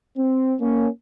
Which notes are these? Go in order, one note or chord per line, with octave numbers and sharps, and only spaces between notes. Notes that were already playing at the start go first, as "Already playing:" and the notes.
C4
A#3 C#4